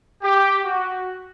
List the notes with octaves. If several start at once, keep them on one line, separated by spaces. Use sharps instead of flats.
G4
F#4